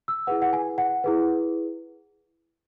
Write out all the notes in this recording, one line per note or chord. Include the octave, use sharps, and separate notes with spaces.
E6
E4 G#4 B4 F#5
F#5
G#5
F#5
E4 G#4 B4